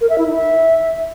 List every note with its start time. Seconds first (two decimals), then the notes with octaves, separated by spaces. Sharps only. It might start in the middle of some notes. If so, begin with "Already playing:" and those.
0.01 A#4
0.10 E5
0.18 E4
0.27 D#4
0.35 E5